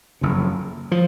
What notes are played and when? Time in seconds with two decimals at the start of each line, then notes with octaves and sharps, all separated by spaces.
0.21 F#1 F2 C#3
0.91 F3